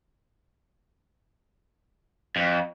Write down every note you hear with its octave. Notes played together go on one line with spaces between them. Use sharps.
F2